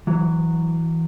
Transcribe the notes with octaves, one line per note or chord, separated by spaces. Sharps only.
E3 F#3